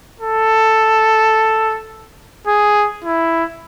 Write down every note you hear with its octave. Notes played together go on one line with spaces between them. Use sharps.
A4
G#4
E4